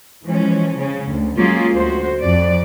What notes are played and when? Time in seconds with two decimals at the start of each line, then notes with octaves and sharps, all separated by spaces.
0.24 E3 F3 G#3 C#4
0.76 C#3 C#4
1.08 D2
1.37 F#3 G#3 A#3 C#4 F4 G#4
1.75 D2 F#4 C5
2.21 F2 D5